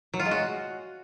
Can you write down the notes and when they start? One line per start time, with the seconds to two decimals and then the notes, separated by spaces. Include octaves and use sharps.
0.14 F#3
0.19 F4
0.25 G#3
0.31 F#4